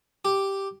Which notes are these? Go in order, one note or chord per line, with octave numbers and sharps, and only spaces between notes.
G4